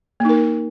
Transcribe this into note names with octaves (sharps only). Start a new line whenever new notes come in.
A#3 D#4 A#4